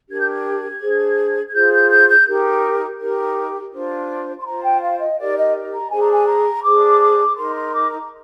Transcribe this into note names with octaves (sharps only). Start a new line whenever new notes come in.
D4 G4 A#4 G#6
G6
G#6
D4 G#4 C5
G#6
F4 G#4 C5 G6
G6
G6
G6
D#4 G4 A#4
D#4 G4 A#4
D4 F4 C5
C6
F4 C5 A#5
G5
F5
D#5
D#4 G4 A#4 D5
D#5
A#5
D4 G#4 C5 G#5
A#5
G#5
A#5
D4 G#4 C5 D6
D6
D#4 A#4 C6
C6
D6
A#5